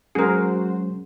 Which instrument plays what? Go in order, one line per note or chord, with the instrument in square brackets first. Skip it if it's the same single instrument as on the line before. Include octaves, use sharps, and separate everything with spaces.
[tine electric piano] F#3 G#3 C#4 [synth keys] F#4 C5 [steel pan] G#4 A#4